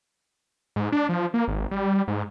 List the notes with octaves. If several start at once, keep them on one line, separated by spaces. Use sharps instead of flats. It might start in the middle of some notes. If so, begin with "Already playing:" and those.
G#2
D4
F3
A#3
G#1
G3
G#2